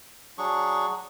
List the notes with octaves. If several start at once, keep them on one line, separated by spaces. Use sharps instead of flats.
F#3 D4 G#4 C#6